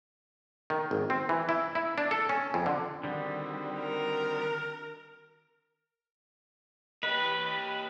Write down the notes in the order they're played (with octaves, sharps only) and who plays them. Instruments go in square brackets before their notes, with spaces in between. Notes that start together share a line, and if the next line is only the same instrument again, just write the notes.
[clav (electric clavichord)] D#3
G#1
C4
E3
E4
E4
D4
A4
C#4
F2
D3
[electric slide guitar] D3 G3 [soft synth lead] D#3 [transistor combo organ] C4 D#4 F#4
[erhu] A#4
[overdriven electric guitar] G4 D#5 [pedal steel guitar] B4